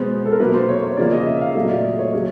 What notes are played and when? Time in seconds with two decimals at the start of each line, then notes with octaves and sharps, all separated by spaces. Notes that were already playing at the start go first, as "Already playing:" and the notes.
Already playing: B2 G#3 B3 C5
0.25 A4
0.32 A#4
0.40 B2 F#3 A#3 B4
0.54 C5
0.69 C#5
0.83 C#5
0.97 C#3 F3 A#3 D5
1.12 D#5
1.26 E5
1.37 E5
1.41 F5
1.55 A#2 F#3 A3 D#5
1.69 D5
1.84 D#5
1.99 C#5
2.13 C#3 F#3